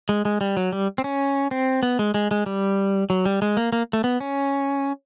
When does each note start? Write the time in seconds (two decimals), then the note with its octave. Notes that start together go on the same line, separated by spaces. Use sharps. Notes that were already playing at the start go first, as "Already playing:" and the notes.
0.09 G#3
0.25 G#3
0.41 G3
0.57 F#3
0.73 G3
0.98 C4
1.04 C#4
1.51 C4
1.83 B3
1.99 G#3
2.14 G#3
2.31 G#3
2.46 G3
3.10 F#3
3.25 G3
3.42 G#3
3.57 A#3
3.73 A#3
3.93 A3
4.04 B3
4.20 C#4